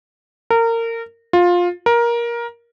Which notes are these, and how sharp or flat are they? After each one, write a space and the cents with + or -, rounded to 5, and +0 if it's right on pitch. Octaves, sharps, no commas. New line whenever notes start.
A#4 -25
F4 +15
A#4 +15